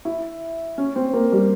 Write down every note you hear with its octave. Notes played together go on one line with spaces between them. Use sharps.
E4
C#4
C4
A#3
G3